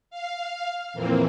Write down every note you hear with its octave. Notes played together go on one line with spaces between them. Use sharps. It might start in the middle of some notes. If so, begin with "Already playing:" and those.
F5
F2 A#2 E3 A#3 C4